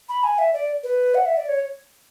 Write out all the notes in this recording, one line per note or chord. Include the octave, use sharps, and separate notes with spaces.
B5
G#5
E5
D5
B4
F#5
E5
D5
C#5